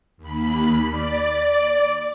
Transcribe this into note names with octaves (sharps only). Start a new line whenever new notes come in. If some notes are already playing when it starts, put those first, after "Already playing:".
D#2 B5
D5